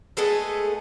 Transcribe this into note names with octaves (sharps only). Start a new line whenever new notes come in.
G#3 A3 B3 A4